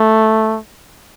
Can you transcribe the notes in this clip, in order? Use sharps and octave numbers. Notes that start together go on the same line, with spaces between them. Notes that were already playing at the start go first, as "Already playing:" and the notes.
Already playing: A3